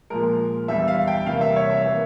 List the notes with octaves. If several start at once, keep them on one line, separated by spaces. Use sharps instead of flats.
A#2 F3 G#3 A#4
E2 E3 G3 E5
F5
G5
C3 E3 G3 A#3 F5
E5
C#5
E5
E3 A#3